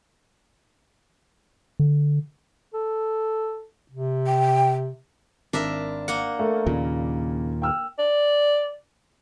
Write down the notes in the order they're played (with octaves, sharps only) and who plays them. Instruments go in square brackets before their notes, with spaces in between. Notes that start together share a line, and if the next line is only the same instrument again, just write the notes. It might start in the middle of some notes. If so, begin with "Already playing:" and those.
[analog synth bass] D3
[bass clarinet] A4
C3
[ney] G5
[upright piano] G#1 [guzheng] D4 A#4 E5
[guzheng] A#3 F#5
[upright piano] A3 A#4
[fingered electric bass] D#2 A#2 [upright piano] C#3
[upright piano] G5 E6 F6
[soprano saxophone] D5